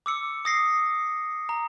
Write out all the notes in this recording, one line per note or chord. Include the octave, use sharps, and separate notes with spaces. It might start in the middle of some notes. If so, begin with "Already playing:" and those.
D6 E6 C#7
D#6 A#6 C7
A#5